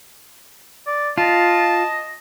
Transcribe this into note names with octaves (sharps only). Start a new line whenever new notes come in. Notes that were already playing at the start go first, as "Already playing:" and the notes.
D5
F4 D#5 A5